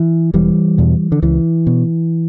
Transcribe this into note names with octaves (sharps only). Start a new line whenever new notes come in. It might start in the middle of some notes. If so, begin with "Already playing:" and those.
Already playing: E3
E1 E3 G3
E2 B2
D3
C#2 E3
B2